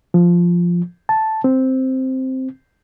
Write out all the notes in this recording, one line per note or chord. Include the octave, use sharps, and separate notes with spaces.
F3
A5
C4